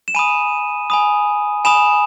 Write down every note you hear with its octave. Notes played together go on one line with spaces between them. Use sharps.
E7
G#5 B5 D#6 D#7
G#5 B5 D#6
G#5 B5 D#6 E7